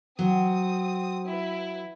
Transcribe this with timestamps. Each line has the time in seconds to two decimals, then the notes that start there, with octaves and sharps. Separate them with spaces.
0.19 F#3 C4 D#6
1.26 E4 B4